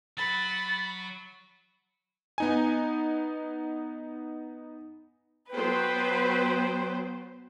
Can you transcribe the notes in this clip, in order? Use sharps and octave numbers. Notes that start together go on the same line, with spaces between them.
F#3 F#4 B5 A6
B3 D#4 G#5
F#3 B3 B4 C5 G5